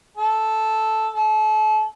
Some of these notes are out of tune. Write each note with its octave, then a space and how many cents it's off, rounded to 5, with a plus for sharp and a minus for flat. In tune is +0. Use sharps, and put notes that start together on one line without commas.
A4 -5
A4 -35